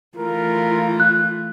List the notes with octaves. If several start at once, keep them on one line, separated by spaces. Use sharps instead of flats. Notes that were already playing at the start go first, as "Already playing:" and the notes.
E3 A3 F4 A#4
F#6